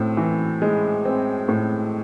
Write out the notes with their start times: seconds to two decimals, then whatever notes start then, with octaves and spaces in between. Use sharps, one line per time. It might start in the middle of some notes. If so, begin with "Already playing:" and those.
Already playing: A2 C4
0.17 E3
0.62 G#3
1.05 C4
1.48 A2